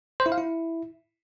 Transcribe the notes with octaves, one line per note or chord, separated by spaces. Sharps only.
C5
E4
F5
E4